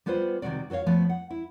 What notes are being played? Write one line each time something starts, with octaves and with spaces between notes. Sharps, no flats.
G3 B3 F4 B4 C5
C3 D#3 F3 G3 F#4 D5
F#4 A4 C5 C#5 F5
F3 A3 B3 C#5
F#5
E4